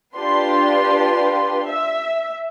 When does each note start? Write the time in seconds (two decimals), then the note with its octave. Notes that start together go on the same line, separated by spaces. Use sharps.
0.17 D4 F4 G4 B4 C6
1.68 E5